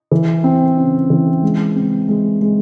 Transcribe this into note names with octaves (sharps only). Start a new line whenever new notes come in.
E3
C4
C#3
E3
G#3
C4
G#3
G#3